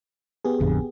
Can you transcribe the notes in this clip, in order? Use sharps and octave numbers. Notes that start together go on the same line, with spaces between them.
B3 G4 G#4
A1 F2 D3